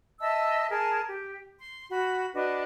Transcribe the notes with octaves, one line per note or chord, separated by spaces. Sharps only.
D#5 E5 A5 E6
G#4 A#4 A5
G4
C6
F#4 B5
D4 F#4 B4 D#5